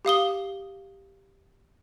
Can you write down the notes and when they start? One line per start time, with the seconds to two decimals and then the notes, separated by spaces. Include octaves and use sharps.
0.05 G4 F5 D#6 G7